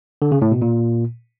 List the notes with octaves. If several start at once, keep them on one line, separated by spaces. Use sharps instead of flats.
D3
C#3
A2
B2
A#2